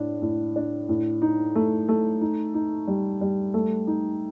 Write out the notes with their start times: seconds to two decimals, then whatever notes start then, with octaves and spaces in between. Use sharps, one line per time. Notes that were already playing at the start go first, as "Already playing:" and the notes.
Already playing: A2 D4
0.22 A2
0.56 D4
0.89 A2
1.22 D#4
1.55 A3
1.89 A3
2.21 D#4
2.54 D#4
2.87 G3
3.21 G3
3.54 A3
3.87 D#4